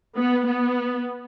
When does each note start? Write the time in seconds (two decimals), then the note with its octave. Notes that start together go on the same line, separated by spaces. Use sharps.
0.16 B3
0.46 B3